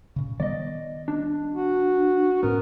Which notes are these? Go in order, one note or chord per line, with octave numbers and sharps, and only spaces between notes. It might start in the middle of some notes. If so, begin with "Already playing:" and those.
A#2 C#3
D#3 G3 B3 D5 D#5
D4
F#4
A2 B3 C#4 A#4